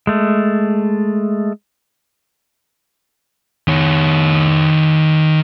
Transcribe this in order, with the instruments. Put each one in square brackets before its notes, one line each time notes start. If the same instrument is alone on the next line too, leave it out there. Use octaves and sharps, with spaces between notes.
[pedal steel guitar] G#3 A3
[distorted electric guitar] D#3 C#5